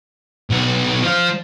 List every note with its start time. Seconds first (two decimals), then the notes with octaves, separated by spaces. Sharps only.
0.50 B1 F#4
1.02 F3 F4